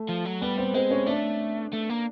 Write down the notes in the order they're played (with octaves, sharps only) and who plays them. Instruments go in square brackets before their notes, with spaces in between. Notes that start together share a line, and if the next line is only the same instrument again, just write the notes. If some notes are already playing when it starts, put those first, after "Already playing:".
Already playing: [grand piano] A3 A4
[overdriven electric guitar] F3
F#3
[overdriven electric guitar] G3 [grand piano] B3 B4
[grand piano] C4 C5
[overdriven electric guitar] G#3 [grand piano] C4 C5
[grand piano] C#4 C#5
[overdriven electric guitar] A3 [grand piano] D4 D5
[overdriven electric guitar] A3
A#3